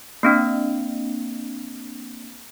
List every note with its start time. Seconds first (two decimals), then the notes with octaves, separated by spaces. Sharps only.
0.23 A#3 C4 D4